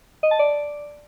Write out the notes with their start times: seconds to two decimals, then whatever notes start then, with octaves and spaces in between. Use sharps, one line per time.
0.23 D#5
0.31 A5
0.39 D5